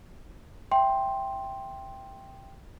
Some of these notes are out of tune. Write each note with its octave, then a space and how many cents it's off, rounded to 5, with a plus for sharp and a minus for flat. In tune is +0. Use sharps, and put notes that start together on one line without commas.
E5 +10 G5 +0 C6 +10